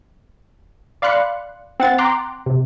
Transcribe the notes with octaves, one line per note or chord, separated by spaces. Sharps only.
D5 F5 B5 C6 F#6 C#7
C4 F#5 A6
G5 A#5 C6 D6 F#6
C3